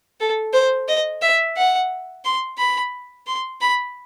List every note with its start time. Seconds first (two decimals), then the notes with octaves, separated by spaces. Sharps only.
0.20 A4
0.53 C5
0.88 D#5
1.22 E5
1.57 F#5
2.24 C6
2.58 B5
3.27 C6
3.61 B5